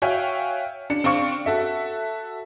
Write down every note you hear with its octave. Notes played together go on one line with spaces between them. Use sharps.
F#4 C#5 E5 F5 G5 G#5
D4 C#7
C4 D4 F5 C#6 C#7
F#4 A4 E5